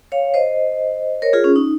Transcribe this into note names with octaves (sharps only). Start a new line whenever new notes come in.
C#5 F5
C5 D#5
A#4 C#5
F4 G#4
C#4
D#4